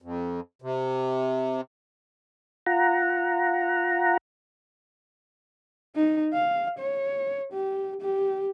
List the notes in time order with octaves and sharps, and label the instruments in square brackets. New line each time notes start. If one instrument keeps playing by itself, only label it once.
[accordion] F2
C3
[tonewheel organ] F4 F#5 A#5
[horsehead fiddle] D#4
F5
C#5
G4
G4